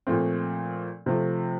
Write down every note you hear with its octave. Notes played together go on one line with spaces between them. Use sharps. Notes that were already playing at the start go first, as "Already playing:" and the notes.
A#2 F3 A3 C4
C3 F3 A3